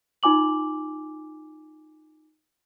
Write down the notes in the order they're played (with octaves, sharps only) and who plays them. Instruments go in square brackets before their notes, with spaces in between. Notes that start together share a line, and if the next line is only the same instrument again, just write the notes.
[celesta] D#4 F4 G#5 D6 F#7